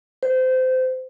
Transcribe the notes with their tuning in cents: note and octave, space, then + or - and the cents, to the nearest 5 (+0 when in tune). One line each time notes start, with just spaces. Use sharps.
C5 -25